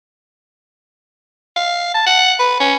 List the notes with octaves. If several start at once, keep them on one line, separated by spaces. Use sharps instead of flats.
F5
A5
F#5
B4
C#4